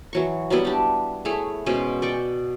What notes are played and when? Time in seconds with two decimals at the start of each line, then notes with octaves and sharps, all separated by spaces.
0.13 E3 F#3 C#6
0.50 F#3 G3 B3 E4
0.65 D4 G4
1.25 A3 E4 G#4 C#5
1.66 B2 G#3 C#4 C5
2.02 D5 G5 C#6